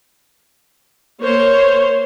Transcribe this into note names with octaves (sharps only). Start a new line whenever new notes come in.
A#3 C5 C#5